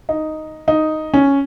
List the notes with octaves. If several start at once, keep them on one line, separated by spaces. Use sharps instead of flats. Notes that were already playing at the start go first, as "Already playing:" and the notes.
D#4
D#4
C#4